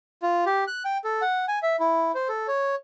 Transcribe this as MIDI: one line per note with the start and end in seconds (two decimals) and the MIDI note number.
0.23 0.44 65
0.46 0.64 67
0.67 0.83 90
0.85 0.98 79
1.04 1.22 69
1.22 1.45 78
1.48 1.59 80
1.63 1.76 76
1.80 2.12 64
2.15 2.28 72
2.29 2.47 69
2.48 2.75 73